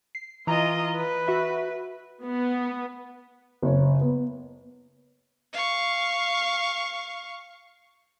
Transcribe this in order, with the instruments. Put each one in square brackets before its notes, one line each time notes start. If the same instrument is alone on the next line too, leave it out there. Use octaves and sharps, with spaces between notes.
[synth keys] C7
[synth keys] E3 A#5 [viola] F4 D#5
[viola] B4
[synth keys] F#4 E5
[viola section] B3
[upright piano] F#1 C#5
B3
[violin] F5 C#6